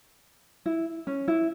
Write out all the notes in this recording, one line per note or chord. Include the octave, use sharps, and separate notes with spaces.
E4
C#4
E4